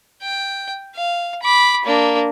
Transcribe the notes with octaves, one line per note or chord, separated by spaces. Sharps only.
G5
F5
B5 D6
A#3 D4